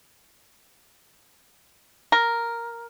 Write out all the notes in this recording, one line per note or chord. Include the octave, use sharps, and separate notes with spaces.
A#4